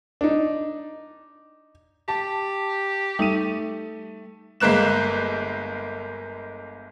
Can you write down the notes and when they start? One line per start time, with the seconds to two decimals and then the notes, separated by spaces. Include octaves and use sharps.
0.21 D4 D#4
2.08 G4 A5
3.19 G3 A3 D#4 D#7
4.60 G1 G#3 A#3 F#6 E7